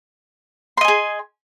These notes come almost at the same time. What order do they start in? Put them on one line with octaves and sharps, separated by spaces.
C6 D#5 G#5 G#4